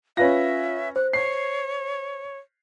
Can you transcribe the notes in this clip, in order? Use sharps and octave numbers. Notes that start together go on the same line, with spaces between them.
C#4 F4 B4 E5 F5 A#6
C5 F#6
C#5 C7